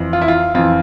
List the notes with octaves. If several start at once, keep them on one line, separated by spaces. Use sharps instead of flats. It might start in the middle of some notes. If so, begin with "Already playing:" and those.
Already playing: F2 E3
F4
E4
F4
F2 E3 F4